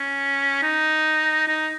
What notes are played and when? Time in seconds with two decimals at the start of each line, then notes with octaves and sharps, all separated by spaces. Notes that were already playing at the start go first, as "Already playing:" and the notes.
Already playing: C#4
0.63 D#4
1.48 D#4